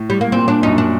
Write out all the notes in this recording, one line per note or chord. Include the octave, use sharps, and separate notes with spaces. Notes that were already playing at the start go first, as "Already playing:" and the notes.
Already playing: A2
G3
A#3
A#2 C4
D4
F#2 D#4
D4